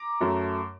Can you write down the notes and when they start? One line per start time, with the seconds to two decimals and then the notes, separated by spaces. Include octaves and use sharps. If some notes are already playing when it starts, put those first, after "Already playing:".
Already playing: A#5 D6
0.20 F#2 F#3 A3